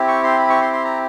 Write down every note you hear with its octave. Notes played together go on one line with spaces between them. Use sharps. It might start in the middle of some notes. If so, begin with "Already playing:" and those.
Already playing: C4 E4 G4
C#6
C6
B5
C#6
C6
C6
A#5